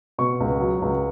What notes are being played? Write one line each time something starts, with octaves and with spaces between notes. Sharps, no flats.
B2 C#6
C#2
F#3
C#2